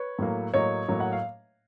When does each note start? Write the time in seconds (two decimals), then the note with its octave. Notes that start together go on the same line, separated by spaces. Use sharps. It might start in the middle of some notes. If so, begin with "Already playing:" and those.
Already playing: B4 C#5
0.19 A2 F#3 A#3
0.54 A2 F#3 A#3 C#5 D#5
0.88 A2 F#3 A#3
1.00 F#5
1.12 F5